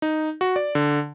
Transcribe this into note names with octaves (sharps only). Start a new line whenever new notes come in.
D#4
F#4
D5
D3